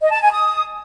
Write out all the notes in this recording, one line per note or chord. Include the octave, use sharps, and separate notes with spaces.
D#5
A5
G#5
D#6